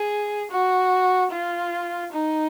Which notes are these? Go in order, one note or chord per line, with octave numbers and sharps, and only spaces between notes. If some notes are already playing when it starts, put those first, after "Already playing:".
Already playing: G#4
F#4
F4
D#4